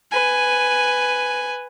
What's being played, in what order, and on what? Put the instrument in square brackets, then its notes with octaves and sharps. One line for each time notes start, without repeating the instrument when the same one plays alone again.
[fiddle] B4 G#5